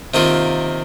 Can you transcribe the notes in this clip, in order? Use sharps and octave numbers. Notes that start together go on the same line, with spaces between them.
C3 D#3 A#3 F4